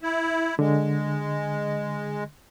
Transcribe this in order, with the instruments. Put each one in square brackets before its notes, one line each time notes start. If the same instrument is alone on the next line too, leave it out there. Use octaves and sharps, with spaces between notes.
[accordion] E4
[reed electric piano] D3 [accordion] G#3